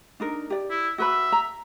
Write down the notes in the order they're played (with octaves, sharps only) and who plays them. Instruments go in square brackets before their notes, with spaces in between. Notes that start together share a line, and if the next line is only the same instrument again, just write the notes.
[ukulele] D4 D#4 A#4
G4 D5
[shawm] E4
[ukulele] F#4 B4 B5 [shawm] E5
[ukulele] A#5